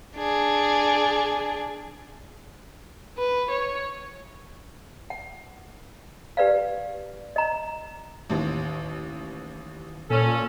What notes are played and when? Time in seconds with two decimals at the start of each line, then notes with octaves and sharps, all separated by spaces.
0.16 D4 G#4
3.18 B4
3.50 C#5
5.10 F#5
6.37 G4 B4 D5 F5
7.36 D#5 A#5
8.30 A1 D#2
10.10 A#2 C#4 A4